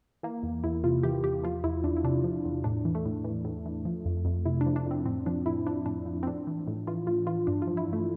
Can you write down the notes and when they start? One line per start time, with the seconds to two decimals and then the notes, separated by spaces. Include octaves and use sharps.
0.23 E3 A#3
0.43 E2
0.64 E2 E4
0.84 C3 F4
1.03 E3 G4
1.24 E2 G4
1.44 F3 F4
1.64 E2 E4
1.84 E2 D4
1.97 E4
2.04 C3 D4
2.24 F3
2.45 E2
2.64 A2 D4
2.85 E3
2.95 A3
3.06 A2
3.24 E3
3.45 A2
3.66 E3
3.85 F3
4.05 F2
4.25 F2
4.45 C3 E4
4.61 D4
4.66 F3
4.76 D4
4.86 F2
4.91 C4
5.05 A2 C4
5.26 F3 D4
5.46 A2 E4
5.67 F3 D4
5.86 A2 D4
6.06 F3
6.23 C4
6.27 A2 D4
6.47 E3
6.67 A2
6.87 E3 F4
7.07 A2 F4
7.27 E3 F4
7.47 G2 D4
7.62 F4
7.67 F3
7.77 E4
7.88 G2
7.93 A3